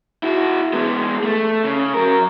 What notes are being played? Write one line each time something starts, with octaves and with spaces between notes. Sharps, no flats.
E4 F#4
G#3 B3
A3
C#3
F#3 A#4